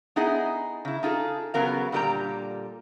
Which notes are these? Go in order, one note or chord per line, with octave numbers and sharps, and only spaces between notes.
B3 D#4 E4 G#4 D#5 F#5
C#3 E4
D#4 F4 G#4 A4
C#3 F#3 B3 A#4 F5
A#2 D3 G3 A#3 G5 A#5